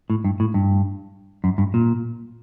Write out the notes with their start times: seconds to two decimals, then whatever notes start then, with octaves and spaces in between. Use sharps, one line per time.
0.10 A2
0.25 G2
0.40 A2
0.54 G2
1.44 F#2
1.58 G2
1.74 A#2